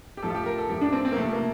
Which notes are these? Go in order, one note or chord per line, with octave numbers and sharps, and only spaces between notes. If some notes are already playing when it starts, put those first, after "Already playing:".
G4
A2 F3 A4
F4
G4
A#4
A4
A2 F3 G4
D4
C4
C4
A#3
C3 F3 A3
A#3